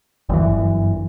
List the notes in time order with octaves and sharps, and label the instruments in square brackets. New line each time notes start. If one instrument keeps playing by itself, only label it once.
[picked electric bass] G1 F#2 A2 E3